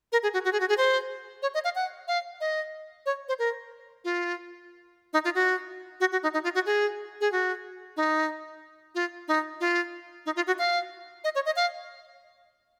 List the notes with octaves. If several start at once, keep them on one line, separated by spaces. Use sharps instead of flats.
A#4
G#4
F#4
F#4
G#4
F#4
G#4
C5
C#5
D#5
F5
F#5
F5
D#5
C#5
C5
A#4
F4
D#4
F4
F#4
F#4
F#4
D#4
D#4
F4
F#4
G#4
G#4
F#4
D#4
F4
D#4
F4
D#4
F4
F#4
F5
D#5
C#5
D#5
F5